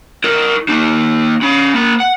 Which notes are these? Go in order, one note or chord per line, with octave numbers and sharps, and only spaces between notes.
E4 A#4
A#3 D#4
C#4 B5
A#3 B5
F#5